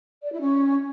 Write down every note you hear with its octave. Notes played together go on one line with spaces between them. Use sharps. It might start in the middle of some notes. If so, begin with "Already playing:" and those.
D5
E4
C#4